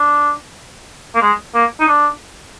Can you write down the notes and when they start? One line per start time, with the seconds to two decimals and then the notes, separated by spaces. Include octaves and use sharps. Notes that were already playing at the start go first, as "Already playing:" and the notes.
Already playing: D4
1.15 A#3
1.22 G#3
1.55 A#3
1.81 D#4
1.88 D4